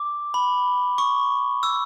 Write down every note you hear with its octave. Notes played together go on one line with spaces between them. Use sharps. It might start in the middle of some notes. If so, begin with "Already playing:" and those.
Already playing: D6
B5
C#6
E6